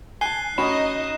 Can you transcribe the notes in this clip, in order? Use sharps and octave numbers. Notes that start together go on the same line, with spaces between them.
G#5 A5 F#6 C7 G7
C#4 D#4 F#4 D#5 B5 E7